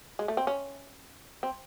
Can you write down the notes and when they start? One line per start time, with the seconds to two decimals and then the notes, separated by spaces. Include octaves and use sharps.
0.19 G#3
0.28 A3
0.37 C4
0.47 C#4
1.43 C4